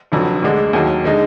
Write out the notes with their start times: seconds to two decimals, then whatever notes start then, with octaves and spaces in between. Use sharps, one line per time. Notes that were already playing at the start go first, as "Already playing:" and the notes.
0.12 F1 F2 D3 F#3
0.42 D2 D3 G#3 D4
0.73 D#2 D#3 F#3
1.04 D3 G#3 D#4